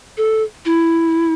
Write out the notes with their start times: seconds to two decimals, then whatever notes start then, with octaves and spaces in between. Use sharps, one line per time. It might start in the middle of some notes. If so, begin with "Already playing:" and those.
0.17 A4
0.65 E4